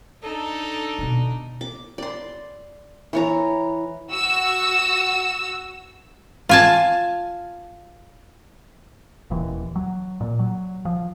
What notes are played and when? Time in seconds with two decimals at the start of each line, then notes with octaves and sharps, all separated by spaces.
0.23 D4 D#4 A4
0.99 B2 D3
1.61 D6
1.98 D5 C6
3.13 E3 C#5 A#5
4.11 F#4 E6
6.49 F4 G#5 A5
9.30 D#1 D#2 E3
9.76 F#3
10.21 A#2
10.39 F#3
10.85 F3